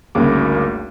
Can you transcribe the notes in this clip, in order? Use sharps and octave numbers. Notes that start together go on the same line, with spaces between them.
G#1 D2 C#3 G3 A#3 D6